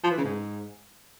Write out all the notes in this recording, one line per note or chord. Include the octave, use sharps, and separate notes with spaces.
F3
E3
C#3
G#2